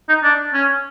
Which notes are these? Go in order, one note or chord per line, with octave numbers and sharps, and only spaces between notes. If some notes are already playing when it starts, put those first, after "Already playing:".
D#4
D4
C#4